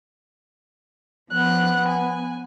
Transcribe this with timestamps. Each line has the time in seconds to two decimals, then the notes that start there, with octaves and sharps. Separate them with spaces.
1.31 F3 B3 F#6
1.88 G#5